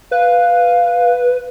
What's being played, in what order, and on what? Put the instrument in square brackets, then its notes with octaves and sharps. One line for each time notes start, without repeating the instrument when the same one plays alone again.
[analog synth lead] B4 [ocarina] F5